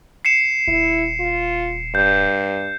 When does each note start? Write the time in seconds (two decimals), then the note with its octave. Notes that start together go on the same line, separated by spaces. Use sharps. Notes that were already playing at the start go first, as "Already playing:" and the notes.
0.25 C7 C#7 E7
0.68 D#1 E4
1.20 F4
1.95 G2 G6